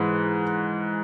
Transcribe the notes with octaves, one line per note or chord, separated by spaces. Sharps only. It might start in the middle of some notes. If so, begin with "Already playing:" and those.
Already playing: G#2 E3